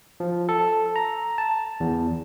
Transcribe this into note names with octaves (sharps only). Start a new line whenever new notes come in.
F3
A4
A#5
A5
E2